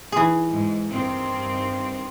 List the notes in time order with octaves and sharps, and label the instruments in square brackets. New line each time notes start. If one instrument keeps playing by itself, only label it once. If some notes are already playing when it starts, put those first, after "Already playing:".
[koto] E3 G#4
[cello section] G#2
G2 D#3 C4